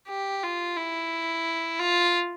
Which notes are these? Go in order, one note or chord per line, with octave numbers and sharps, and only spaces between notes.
G4
F4
E4
F4